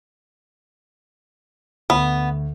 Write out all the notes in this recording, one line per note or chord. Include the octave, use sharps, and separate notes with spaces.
D2 B3